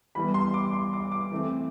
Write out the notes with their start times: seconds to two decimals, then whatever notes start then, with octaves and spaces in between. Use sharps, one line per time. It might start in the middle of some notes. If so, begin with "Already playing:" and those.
0.15 E3 G3 B3 B5
0.34 C6
0.54 D6
0.73 C6
0.93 D6
1.12 D6
1.31 E3 A3 C4